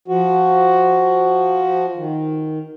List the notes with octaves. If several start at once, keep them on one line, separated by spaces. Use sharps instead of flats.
F3 F#4
D#3